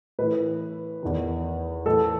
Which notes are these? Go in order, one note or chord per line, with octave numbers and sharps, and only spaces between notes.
A2 E3 B4
E2 D#3
A2 E3 A4